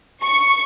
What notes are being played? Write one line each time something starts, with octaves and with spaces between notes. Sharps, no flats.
C#6